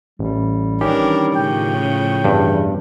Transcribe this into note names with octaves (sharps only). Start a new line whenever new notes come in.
A1 G3
D#3 E3 C#4 D4 G4 A#4
A2 C#3 F3 G5
E2 G2